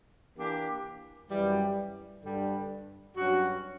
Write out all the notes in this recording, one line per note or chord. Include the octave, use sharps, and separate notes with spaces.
E3 A#3 D4 G4
F#2 E3 G3
G2 D3 G3
G2 F#3 C#4 F#4